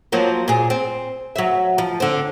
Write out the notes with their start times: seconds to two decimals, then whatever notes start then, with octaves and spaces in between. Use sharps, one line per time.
0.12 F3 F#3 A#3
0.48 A#2 G#4
0.70 C4
1.36 F#3 E5
1.78 F3
2.00 D3 C4